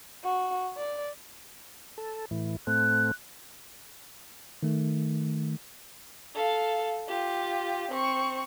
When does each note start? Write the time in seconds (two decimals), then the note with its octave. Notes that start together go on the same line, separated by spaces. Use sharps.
0.24 F#4
0.77 D5
1.98 A4
2.31 A2 E3
2.67 A2 A3 C4 F#6
4.63 D#3 A3
6.35 A4 F5
7.08 F4 G4
7.91 C4 C#6